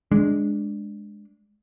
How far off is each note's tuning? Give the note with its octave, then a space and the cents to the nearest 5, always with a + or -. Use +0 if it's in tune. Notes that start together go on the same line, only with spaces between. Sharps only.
G#3 +0 D4 +0